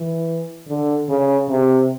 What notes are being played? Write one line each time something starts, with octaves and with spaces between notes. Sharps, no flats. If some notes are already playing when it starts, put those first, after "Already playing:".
Already playing: E3
D3
C#3
C3